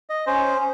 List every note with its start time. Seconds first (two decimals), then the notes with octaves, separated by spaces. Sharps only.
0.10 D#5
0.27 C#4 C5